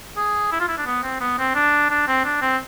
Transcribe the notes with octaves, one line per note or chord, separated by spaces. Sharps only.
G#4
E4
F4
E4
D4
B3
C4
B3
C4
D4
D4
C4
D4
C4